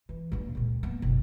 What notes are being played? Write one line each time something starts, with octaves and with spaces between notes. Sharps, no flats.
E3
G2 A#3
C#2 A#2
A#3 B3
F#1 B1